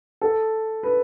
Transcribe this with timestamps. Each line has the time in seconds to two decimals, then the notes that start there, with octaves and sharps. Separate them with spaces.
0.21 A4
0.83 B4